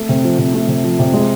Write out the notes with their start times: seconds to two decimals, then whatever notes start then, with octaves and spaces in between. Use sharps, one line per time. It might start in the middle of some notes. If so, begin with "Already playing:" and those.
Already playing: A3
0.09 C3
0.24 F3
0.38 C3
0.54 A3
0.68 C3
0.84 F3
0.99 C3
1.14 G#3